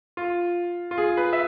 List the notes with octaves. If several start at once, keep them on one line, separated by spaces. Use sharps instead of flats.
F4
F4
G#4
B4
E5